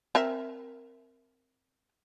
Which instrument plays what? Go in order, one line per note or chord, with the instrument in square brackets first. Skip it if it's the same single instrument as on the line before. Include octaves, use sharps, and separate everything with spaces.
[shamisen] C4 A#4 E5